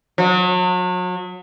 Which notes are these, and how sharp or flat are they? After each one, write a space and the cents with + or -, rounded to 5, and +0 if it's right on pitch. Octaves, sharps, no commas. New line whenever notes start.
F#3 -35